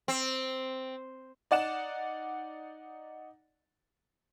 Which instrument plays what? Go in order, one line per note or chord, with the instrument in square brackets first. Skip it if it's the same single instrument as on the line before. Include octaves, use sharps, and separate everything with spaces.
[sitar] C4
[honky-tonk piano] D#4 D5 F#5 E7